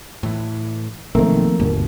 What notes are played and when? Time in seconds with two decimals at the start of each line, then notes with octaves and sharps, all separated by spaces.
0.23 A2 E3
1.15 B1 D#3 F3 A3 A#3 C4 A#4
1.60 G1 D#2 G#2 B2